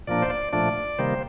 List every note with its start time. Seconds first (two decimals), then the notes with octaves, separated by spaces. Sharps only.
0.07 A#2 F3 A#3 D4 D5
0.22 C5
0.30 D5
0.53 A#2 F3 A3 D4 D5
0.98 C3 D#3 G3 A#3 C5